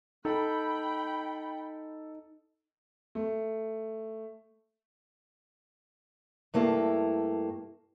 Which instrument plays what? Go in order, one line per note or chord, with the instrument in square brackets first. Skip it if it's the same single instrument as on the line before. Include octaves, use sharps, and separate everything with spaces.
[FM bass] D#4 [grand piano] A4 [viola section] G5 B5
[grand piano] A3
[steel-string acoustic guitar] G2 A3 A#3 E4